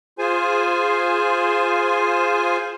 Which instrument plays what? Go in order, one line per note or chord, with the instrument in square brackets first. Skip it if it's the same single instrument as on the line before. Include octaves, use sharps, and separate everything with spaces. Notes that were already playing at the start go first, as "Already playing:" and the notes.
[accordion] F4 G#4 C5 G#5